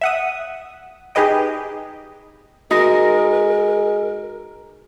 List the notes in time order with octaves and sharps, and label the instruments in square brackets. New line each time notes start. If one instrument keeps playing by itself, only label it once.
[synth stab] E5 F#5 D#6
D#4 G4 G#4 B4 D#5 G5
[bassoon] G#3 [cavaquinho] D#4 [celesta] F#4 A#6 [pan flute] A#4